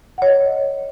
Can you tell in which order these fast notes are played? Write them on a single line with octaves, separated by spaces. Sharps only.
F#5 C#5 D#5